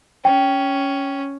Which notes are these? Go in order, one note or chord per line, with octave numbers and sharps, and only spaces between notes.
C#4 G5